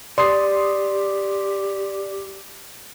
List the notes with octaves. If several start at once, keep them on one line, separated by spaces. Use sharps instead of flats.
G4 D5 C6 D#6 C7